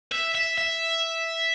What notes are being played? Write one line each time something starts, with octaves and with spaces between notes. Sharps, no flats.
E5
E5
E5